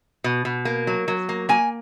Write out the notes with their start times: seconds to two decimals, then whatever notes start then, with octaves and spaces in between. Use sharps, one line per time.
0.24 B2
0.45 B2
0.65 A#3
0.87 F#3
1.08 F#3
1.29 A#3
1.49 A#3 G#5